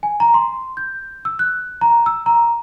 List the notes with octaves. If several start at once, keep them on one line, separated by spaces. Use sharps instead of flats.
G#5
A#5
C6
G6
E6
F#6
A#5
E6
A#5